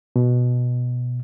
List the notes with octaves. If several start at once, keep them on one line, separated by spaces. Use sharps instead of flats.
B2